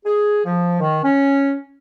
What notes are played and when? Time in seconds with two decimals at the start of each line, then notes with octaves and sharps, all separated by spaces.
0.05 G#4
0.45 F3
0.80 D#3
1.03 C#4